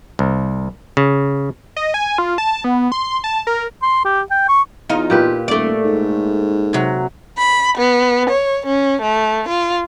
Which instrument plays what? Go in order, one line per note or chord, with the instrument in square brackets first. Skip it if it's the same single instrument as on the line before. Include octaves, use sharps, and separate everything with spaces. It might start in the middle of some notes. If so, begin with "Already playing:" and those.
[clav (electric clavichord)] C2
C#3
[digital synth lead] D#5
G#5
F4
A5
B3
C6
A5
A#4
[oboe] C6
G4
G5
C#6
[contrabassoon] E2 [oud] D#4 F4
[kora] A#2 G4 B4
[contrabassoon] D#1 [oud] A3 D5
[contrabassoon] G#2
[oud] C3 F#3
[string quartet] B5
B3
C#5
C#4
A3
F4